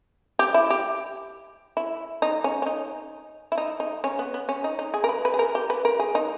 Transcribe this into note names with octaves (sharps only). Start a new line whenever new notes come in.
G4
E4
G4
E4
D#4
C#4
C#4
D#4
E4
D#4
D#4
C#4
B3
B3
C#4
D#4
D#4
G#4
A#4
B4
B4
G#4
A#4
G4
B4
A#4
G#4
D#4